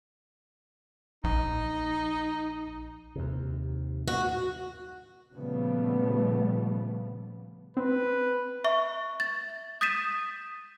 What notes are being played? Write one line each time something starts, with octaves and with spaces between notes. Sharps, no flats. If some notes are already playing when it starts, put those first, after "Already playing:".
A#1 D#4
D#2 C3
F#4
A#2 C#3 F3 G3 A3 B3
C4 B4
E5 C#6
A6
D#6 G6 A6 B6 D#7 E7